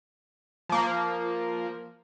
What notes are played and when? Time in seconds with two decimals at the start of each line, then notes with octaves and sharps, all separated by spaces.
0.69 F3 A#3